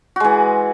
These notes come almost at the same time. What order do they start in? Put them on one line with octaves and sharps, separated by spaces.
F#4 G#3 E3